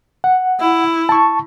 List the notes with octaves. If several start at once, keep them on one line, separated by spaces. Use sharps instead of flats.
F#5
E4
A5 C#6